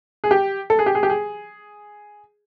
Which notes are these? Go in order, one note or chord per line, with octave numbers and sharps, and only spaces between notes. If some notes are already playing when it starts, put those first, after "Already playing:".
G#4
G4
A4
G#4
G4
G#4
G4
G#4